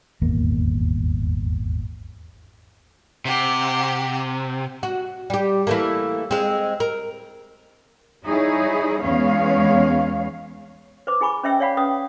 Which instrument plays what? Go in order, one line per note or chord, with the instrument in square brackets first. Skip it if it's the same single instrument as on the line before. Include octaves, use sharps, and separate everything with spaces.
[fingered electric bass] D#1 G#1 E2 A#3
[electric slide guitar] C3 [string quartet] G4 F#5
[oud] F#4
G3 G4
E3 A3 A#3
G#3 C4
A#4
[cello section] G3 D#4 E4 G#4 C#5
E2 G#3 B3 C#4 C#5 F5
[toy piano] B4 C5 D6
E4 G#4 G#5 B5 C#6
C#4 C5 D#5 E5 G5 E6
C#5 D5 F5 F#5 B5
C#4 B4 D#6